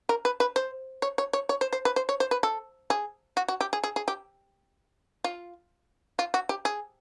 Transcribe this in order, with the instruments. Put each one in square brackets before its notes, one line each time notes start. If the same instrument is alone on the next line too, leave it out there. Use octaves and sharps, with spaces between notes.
[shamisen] A#4
B4
B4
C5
C#5
C#5
C#5
C#5
C5
C5
B4
C5
C#5
C5
B4
A4
G#4
F#4
F#4
G4
G#4
G#4
G#4
G4
F4
F4
F#4
G4
G#4